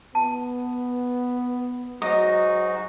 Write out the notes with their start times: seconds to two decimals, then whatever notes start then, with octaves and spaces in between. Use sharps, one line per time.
0.15 B3 A5
2.02 G#2 F#3 D#4 F#4 D#5